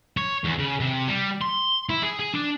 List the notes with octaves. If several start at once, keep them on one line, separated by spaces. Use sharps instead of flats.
C#5
E2
C#3
C3
G3
C6
E4
G#4
G#4
D4